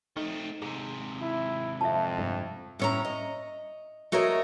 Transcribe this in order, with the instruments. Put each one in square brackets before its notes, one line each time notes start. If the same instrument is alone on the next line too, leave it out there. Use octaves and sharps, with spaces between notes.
[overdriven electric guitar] A3 C4 [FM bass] D#4
[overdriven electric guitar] G#2 C3 [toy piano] G#4
[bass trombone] E4
[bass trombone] F2 [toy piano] E5 A5
[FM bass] G2
[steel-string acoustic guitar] A2 C#4 A#5
D#5
A3 F#4 A#4 C#5 D#5